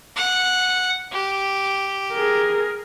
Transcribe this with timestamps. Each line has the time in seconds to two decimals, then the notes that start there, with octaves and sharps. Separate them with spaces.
0.16 F#5
1.12 G4
2.14 G#4 A#4